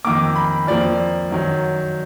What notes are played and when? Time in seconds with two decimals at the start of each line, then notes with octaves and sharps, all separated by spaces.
0.05 F2 D#3 A#3 D6
0.35 B5
0.67 F2 F3 A#3 D5
1.31 F#2 D#3 F#3